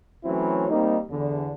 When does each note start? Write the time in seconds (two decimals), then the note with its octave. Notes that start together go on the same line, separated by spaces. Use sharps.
0.24 E3 F#3 A3 C4 C#4 E4
0.69 G3 A#3 C4 D#4
1.10 E2 D3